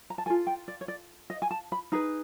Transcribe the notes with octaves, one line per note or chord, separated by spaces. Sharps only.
A#5
A5
F4 A4 G#5
G5
D5
C#5
D5
D#5
G#5
A5
B5
D#4 G#4 B4 A#5